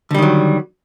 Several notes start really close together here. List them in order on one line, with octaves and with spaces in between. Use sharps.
D3 G3 D#3 F#3